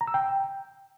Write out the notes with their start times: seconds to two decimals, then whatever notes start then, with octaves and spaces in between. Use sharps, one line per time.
0.01 A#5
0.07 E6
0.14 G5